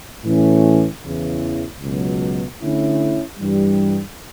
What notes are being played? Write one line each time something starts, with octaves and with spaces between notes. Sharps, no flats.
A2 E3 A3 C#4
E2 C#3 E3
C#2 B2 F#3
D3 A3 C#4 E4
G2 E3 G3